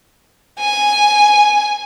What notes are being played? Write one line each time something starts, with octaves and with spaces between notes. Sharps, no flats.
G#5